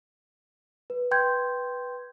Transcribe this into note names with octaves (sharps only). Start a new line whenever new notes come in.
B4
B4 G5 C6 G6 G#6